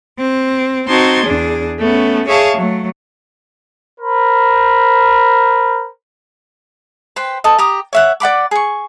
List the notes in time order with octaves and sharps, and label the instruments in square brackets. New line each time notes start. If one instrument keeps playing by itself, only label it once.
[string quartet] C4
C4 D#4 F#4 A5 C6 G#6
E2 D4 G#4
A3 B3 C#4
G#4 C#5 E5 F5 A5
F#3 A3
[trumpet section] A#4 C5 B5
[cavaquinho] B4 C5 G5
A4 D#5
G4 A#5 D#6
C#5 E5 F#5
D5 F#5 B5 D6
G#4 C#6